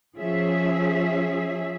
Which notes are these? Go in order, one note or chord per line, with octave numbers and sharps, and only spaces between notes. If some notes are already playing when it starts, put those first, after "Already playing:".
F3 C#4 G#4 E5